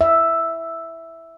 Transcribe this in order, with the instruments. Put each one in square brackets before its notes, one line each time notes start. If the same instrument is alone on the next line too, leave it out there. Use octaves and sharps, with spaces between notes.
[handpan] E5